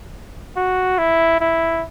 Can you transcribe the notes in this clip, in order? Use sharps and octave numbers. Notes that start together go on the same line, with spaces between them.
F#4
E4
E4